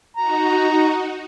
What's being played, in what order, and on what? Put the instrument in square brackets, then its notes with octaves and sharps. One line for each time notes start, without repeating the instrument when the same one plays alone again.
[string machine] D#4 F#4 [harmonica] A#5